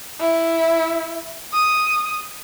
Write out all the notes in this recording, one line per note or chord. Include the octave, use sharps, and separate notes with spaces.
E4
D#6